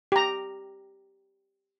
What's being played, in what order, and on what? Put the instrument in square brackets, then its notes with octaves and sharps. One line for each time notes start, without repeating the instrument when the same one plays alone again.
[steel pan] G4 A#5